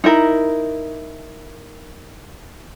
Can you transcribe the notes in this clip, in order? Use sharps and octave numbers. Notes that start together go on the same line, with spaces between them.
D#4 E4 A#4